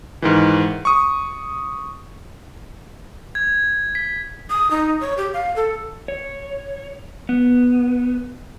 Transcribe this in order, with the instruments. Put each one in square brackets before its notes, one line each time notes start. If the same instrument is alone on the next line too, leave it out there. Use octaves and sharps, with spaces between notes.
[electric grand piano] G#2 D#3 E3
C#6 D#6
[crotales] G#6
B6
[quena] D#6
D#4
C#5
G4
F5
A4
[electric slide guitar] C#5
B3